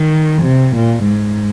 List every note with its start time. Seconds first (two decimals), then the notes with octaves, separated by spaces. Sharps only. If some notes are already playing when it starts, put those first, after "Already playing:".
Already playing: D#3
0.43 C3
0.76 A#2
1.09 G#2